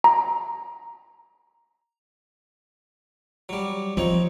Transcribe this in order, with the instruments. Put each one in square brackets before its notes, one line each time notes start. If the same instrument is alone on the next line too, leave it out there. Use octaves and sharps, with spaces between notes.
[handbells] A#5
[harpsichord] F#3 G3
[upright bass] F3 [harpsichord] C4 D#4 C#5